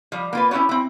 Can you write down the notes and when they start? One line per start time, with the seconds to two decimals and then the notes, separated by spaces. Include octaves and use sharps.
0.12 F3 G3
0.33 A#3 F4 B4
0.51 C#4 E4 F#4 G4 C#5
0.69 C4 E4